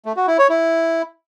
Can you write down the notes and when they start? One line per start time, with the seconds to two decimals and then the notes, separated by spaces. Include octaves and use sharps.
0.06 A3
0.17 F#4
0.28 E4
0.39 C#5
0.49 E4